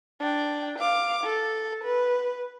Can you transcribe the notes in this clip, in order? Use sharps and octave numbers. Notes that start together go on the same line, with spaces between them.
D4 G5
F5 D6
A4
B4